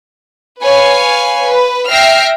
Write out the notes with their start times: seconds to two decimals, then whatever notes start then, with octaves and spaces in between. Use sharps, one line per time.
0.63 B4 C#5 F5 G#5
1.46 B4
1.90 E5 G5 F6 A#6 C7